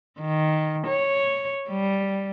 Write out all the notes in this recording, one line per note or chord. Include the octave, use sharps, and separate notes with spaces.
D#3
C#5
G3